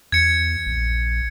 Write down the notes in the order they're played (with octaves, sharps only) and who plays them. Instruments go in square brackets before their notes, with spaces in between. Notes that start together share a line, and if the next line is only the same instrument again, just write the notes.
[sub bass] E2 [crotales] G#6 C#7
[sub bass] A#1